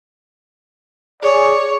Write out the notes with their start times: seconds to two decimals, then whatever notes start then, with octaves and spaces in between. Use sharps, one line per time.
1.22 G#4 C#5 D5